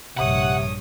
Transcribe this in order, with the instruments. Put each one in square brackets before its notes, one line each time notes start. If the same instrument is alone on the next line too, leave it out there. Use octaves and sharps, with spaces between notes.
[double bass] A#1 G2 [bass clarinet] C3 [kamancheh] C#5 D#6 [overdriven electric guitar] F#5